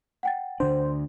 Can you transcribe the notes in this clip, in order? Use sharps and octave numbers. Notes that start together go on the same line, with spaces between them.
F#5 G5 A6
D2 D3 D4 C5